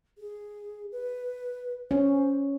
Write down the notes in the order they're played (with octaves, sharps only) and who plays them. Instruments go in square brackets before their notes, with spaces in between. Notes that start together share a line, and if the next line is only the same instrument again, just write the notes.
[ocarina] G#4
B4
[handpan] C#4 [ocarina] C5